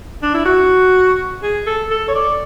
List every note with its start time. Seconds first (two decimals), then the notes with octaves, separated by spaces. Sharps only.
0.23 D4
0.35 E4
0.46 F#4
1.42 G#4
1.67 A4
1.91 A4
2.08 C#5
2.15 D5